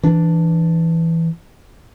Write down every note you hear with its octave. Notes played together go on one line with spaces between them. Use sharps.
E3 D4